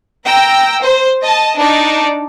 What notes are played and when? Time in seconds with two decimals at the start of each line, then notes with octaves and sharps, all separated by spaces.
0.24 G5 A#5 E6
0.81 C5
1.22 D#5 A5
1.58 D4 D#4 D5